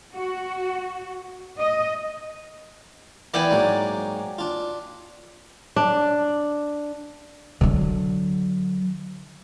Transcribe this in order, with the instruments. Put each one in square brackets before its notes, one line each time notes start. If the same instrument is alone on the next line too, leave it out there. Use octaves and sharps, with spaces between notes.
[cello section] F#4
D#5
[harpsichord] E3 B3 B4 [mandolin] D5 G5 G#5
[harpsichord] G#2 F#3 A#3
D4 F4
[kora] D4
[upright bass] D3 F#3